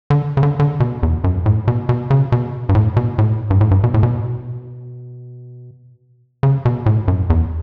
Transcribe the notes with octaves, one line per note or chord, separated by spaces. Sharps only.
D3
C#3
D3
D3
B2
E2
F#2
A2
B2
B2
C#3
B2
G2
A2
B2
A2
G2
A2
G2
B2
A2
B2
C#3
B2
A2
F#2
E2